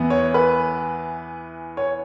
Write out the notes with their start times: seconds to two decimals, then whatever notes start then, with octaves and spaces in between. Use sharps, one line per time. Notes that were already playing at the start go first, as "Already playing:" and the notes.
Already playing: E2 E3 B3 E4
0.10 C#5
0.34 B4
1.77 C#5